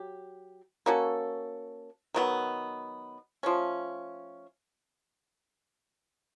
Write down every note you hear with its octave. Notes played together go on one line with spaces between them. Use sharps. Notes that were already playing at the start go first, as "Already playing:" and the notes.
Already playing: F#3 G4
A#3 C#4 F#4 A4
D#3 F#3 B3
F3 A3 C#4